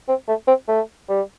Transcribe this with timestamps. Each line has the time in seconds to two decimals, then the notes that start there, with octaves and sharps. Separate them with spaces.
0.08 C4
0.28 A3
0.47 C4
0.68 A3
1.09 G3